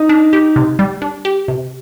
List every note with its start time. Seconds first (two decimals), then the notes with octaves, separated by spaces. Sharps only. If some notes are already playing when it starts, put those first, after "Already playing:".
Already playing: D#4
0.09 D4
0.33 G4
0.56 C3
0.79 G3
1.02 D4
1.25 G4
1.48 C3